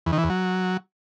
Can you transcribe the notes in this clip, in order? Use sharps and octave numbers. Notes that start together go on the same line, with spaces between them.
E2
D#3
E3
E2
F#3